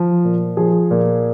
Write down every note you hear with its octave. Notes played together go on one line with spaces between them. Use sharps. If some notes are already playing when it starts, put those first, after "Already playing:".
Already playing: F3
A#2
F3 G#4
A#2